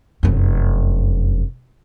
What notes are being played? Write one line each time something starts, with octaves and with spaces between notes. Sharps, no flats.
F1 F#2